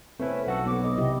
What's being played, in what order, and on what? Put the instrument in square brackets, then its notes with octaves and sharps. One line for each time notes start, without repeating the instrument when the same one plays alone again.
[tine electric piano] A3 C#4 E4 [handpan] C4 [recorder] B4
[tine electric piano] B1 F#4 A4 [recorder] F#5
[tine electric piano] B1 [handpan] B3 [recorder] D6
[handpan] D#5
[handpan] C3 E4 G4 [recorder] D#5